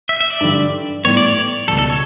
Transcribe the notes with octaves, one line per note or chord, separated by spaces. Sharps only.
E5
E5
D5
G2 D3 G3
A2 G3 B3 C#5
D5
C#5
C#2 B2 G3 A4
A4
C#5